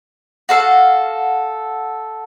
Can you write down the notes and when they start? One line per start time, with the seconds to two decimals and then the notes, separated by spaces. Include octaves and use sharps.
0.49 F#4 A4 F5